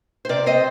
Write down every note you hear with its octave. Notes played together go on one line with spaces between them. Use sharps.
C5
C3 A#4 D5
C4 C5 D#5